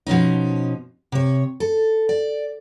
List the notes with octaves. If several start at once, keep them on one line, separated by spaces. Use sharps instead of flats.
B2 F3 C#4 D#4
C3 C#5
A4
D5